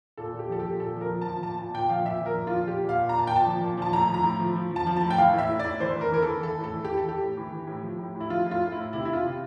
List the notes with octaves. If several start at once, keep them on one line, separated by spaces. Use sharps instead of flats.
A#2 A4
A#2
G4
F3 A4
G4
A#2
A#2 A4
F3
A#4
F3
A5
F3
A#2 A5
A#2 A5
A#2 G5
F3 F5
A#2 E5
F3
A#4
A#2
F4
F3
A#2 G4
A#2
F5
A#2
A#5
A#2 A5
A#2 G5
A5
F3
A#2
F3 A5
A2 A#5
F3
A#5
A2
F3
F3
F3
A5
F3
A5
A2
G5
E3 F5
A2
E5
A2
A2 D5
E3 C5
E3 A#4
E3 A#4
E3 A4
E3 A4
A2
A4
E3
E3 G4
A4
E3 G4
A2
E3
E3
A2
F3
A2
A2
E4
F3 F4
A2
F4
A2
A2 E4
C3 E4
E4
C3 F4
C3